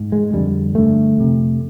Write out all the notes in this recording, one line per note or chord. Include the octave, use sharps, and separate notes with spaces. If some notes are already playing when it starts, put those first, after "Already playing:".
Already playing: G#2
G#3
F2 D3 G3
G2 D3 A3
F2 C3